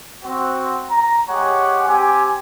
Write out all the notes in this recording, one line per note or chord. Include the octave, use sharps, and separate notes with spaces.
C4 F#4
A#5
G#3 G4 C#5 F#5 G#5
C4 G4 G#5